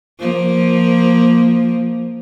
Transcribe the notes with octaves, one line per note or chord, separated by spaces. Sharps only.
F3 A#3